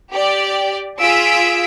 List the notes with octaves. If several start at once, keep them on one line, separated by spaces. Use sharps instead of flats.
G4 D5
F4 G#4 E6 B6 D7